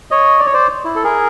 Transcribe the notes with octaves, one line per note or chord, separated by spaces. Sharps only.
C#5 D#5
D5
C#5
C5 D5
E4
A4
G#4 A#4